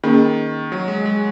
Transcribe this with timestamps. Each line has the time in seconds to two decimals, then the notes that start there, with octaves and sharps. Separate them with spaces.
0.04 D#3 A#3 C#4 G#4
0.72 F#3
0.88 G#3
1.06 G#3